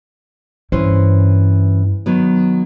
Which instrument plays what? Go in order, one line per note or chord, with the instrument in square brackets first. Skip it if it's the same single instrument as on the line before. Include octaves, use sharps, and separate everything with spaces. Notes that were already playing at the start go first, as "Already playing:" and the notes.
[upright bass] G2 [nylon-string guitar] E3 C#4 C5
[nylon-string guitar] D#3 F#3 B3